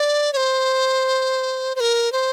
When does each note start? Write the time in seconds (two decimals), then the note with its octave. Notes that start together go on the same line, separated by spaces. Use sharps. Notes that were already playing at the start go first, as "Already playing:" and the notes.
Already playing: D5
0.33 C#5
0.37 C5
1.75 C5
1.80 A#4
2.12 C5